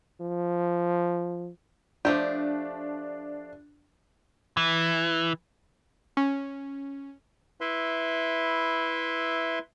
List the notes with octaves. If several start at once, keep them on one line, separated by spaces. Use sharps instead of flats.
F3
F3 A3 D4 G4
E3
C#4
E4 B4 E5 C6